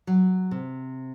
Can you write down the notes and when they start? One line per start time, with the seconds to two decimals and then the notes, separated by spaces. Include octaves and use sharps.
0.07 F#3
0.51 C3